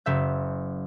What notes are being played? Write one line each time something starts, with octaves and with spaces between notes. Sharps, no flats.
F#1 F#3 E5 G6